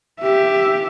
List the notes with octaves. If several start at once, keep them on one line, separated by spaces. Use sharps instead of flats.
G4 E5